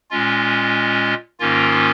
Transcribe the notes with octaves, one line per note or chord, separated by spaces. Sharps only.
A#2 G#3 C#4 F4
G#2 D#3 A#3 C#4 F4